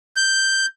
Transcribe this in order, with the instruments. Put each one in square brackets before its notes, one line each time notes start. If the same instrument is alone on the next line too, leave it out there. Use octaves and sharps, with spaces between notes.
[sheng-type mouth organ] G6